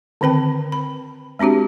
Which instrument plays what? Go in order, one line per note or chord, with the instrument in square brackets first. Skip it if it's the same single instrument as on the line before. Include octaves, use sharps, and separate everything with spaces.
[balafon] D3 D#3 C4 B4 G5
B5
G#3 C4 D4 F#4 G4